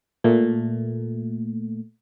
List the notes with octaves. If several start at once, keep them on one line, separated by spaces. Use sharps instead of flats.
A#2 A3